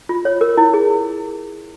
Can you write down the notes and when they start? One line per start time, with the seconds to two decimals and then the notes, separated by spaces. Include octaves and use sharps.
0.09 F4
0.25 C#5
0.41 A#4
0.57 E4
0.74 G#4